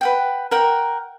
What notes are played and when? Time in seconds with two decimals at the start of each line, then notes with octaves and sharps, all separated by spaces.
0.01 B4 F#5 G5
0.51 A#4 F#5 G5